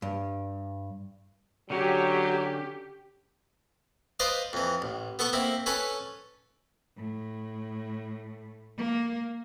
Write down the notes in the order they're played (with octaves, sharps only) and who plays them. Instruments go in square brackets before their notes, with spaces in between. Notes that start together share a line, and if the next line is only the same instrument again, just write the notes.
[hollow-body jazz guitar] G2
[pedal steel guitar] D3 C#4 C#5 [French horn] F#3 [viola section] G4
[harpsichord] B4 C5 D5 D#5 F5
F2 E3
A1
B3 A4 B5 C#6
A#3 C4 E4
C#4 A4 B4 G#5 B5
[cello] A2
A#3